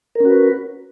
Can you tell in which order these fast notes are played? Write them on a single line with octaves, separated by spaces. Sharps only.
A#4 C#4 F#4 B4